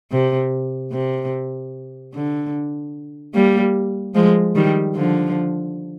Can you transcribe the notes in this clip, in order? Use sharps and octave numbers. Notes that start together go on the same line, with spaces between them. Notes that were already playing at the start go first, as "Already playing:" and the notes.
C3
C3
D3
G3 A#3
F3 G#3
D#3 G3
D3 F3